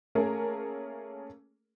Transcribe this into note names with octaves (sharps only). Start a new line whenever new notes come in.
A3 A#3 C#4 G#4 A#4